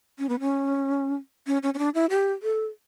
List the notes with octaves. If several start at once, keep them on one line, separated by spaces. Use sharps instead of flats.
C#4
B3
C#4
C#4
C#4
C#4
D4
E4
G4
A4